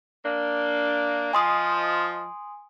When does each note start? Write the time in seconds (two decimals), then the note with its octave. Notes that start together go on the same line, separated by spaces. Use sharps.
0.25 A#3 D4
1.33 F3 D#5 G#5 C6 D#6